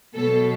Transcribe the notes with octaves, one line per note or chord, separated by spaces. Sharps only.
B2 F#3 A4